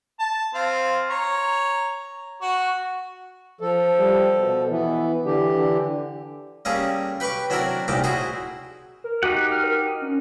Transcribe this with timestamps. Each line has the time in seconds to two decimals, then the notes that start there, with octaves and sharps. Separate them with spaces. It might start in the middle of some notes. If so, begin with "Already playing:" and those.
0.19 A5
0.54 C4 F4
1.10 C#5 A#5
2.42 F#4
3.61 F3 A4
3.99 G3
4.39 B2
4.70 E3 B3
5.25 D3 E3 G4
5.57 D3
6.65 G3 A#3 C#4 G#4 A4
7.20 G4 B4 B5 C#6 D6
7.50 F#3 C4 D4 E4 A#4 D5
7.88 A#1 A2 G3 C4 D#4 D6
8.04 E4 F#4 G#4 C5
9.04 A#4
9.23 D#4 F#4 G4 F#5
9.51 F6
9.64 A#4
10.02 C#4